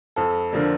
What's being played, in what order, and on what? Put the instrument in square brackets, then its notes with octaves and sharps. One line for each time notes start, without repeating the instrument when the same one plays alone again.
[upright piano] F2 A4
D3 F3 A#3 D4